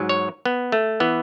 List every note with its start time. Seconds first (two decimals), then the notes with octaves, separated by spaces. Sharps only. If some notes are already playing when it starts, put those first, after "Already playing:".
Already playing: G#2 F#3
0.09 C#5
0.45 B3
0.72 A3
1.00 E3 B3